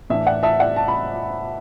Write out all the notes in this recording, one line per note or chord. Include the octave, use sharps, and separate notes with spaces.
A2 E3 D4 E5
D5 F#5
E5 A5
D5 F#5
A5
B5